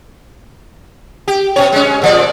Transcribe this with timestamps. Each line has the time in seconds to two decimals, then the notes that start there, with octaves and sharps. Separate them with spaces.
1.28 G4
1.56 B2 C#4 C#5
1.72 G#3 C#4
2.02 A#2 F3 D5